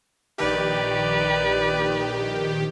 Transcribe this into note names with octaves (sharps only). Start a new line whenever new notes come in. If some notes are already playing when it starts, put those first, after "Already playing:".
A#1 D#3 G4 B4 D5